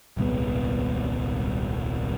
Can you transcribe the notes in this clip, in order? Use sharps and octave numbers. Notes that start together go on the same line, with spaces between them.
D#1 C2 G#2 B3